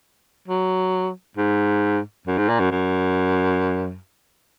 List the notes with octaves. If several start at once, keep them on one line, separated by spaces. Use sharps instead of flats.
F#3
G#2
F#2
G#2
A#2
F#2
F#2